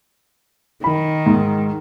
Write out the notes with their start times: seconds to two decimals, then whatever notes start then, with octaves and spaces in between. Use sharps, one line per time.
0.84 D#3 B5
1.26 G#2